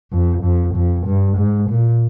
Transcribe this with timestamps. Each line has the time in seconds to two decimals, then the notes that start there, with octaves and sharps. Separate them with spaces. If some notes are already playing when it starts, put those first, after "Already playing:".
0.12 F2
0.43 F2
0.75 F2
1.06 G2
1.37 G#2
1.70 A#2